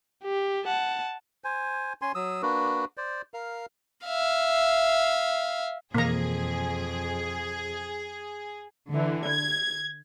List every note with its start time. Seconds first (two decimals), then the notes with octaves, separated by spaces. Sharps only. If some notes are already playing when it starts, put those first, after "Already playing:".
0.24 G4
0.65 F#5 A5
1.44 C5 G#5
2.02 C#4 G#5 C6
2.15 F#3 D#6 E6
2.42 A#3 D4 F#4 B4
2.97 C5 D5
3.34 A#4 F5
4.07 E5 F5
5.94 F2 B2 E3 A#3 G#4 A#5
8.92 D3 E3
9.27 G#6